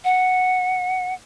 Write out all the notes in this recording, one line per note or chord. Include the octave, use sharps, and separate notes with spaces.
F#5